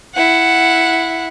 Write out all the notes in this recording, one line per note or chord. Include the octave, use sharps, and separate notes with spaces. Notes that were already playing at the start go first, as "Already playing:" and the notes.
E4 F#5